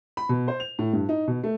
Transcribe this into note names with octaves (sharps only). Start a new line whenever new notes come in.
B5
B2
C5
F7
A2
G2
D#4
B2
A3